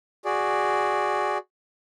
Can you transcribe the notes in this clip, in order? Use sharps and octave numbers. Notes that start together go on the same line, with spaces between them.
F#4 G#4 D5